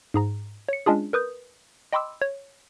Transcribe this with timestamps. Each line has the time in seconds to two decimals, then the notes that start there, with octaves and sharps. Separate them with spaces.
0.14 G#2 G#4 A#5
0.69 C#5 C#7
0.86 G#3 C#4 D4 F4 G#4
1.13 A#4 B4 D#6 G6
1.93 D#5 G5 B5 C6 D6 E6
2.21 C#5